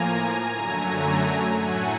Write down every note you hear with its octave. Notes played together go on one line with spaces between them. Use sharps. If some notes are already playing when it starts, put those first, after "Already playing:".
Already playing: A2 F3 A#3 G#5 A#5
F#2 D3 F#3 A3
A2 F#3 A3 F#5 G#5